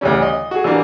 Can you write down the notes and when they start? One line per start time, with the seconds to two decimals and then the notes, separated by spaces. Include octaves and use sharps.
0.01 D2 C#3 E3 G3 C#4
0.22 D#5
0.51 F#4 G#4
0.64 E3 F#3 G3 A#3 D4